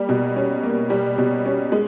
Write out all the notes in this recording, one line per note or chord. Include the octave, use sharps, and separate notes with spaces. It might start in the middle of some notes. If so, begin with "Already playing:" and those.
Already playing: G3 A#3
B2
C#4
A#3
G3
B2
C#4
G#3